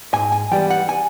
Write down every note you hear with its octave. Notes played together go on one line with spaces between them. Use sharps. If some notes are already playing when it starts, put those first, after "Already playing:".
G#2 G#5
G#5
E3 G3 B3 G5
F#5
G#5